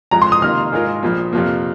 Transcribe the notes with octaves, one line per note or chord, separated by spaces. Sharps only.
F2 F3 G#3 A#5
C6
D#6
C3 D#3 A#3 F4 F6
G#2 G#3 F4 A#4
A#1 A#2 F3 A#3
F2 C3 F3 A#3